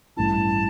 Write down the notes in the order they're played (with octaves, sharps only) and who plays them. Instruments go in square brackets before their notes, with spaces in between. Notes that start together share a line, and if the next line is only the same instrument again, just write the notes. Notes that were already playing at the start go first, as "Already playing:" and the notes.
[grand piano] A1 G2 E3 A3 [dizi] A5